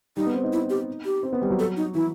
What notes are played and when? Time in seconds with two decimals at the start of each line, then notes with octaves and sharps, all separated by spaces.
0.17 G3 D#4
0.26 B3
0.34 C4
0.43 D#4
0.53 E4
0.70 G4
1.05 G4
1.23 C4
1.33 B3
1.42 G3
1.50 F#3
1.59 A4
1.77 D#4
1.95 E3 E4